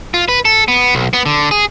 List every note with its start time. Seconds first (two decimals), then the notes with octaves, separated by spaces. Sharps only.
0.14 F4
0.28 B4
0.45 A4
0.68 B3
0.95 B1
1.13 B3
1.26 D3
1.51 G#4